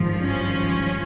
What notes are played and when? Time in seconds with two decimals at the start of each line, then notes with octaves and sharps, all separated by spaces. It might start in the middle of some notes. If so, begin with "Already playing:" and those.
Already playing: G#1 G2 F3
0.20 C#4